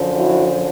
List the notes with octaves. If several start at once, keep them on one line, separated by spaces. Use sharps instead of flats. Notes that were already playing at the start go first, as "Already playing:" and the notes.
Already playing: F#2 D3 F3
E4 F#4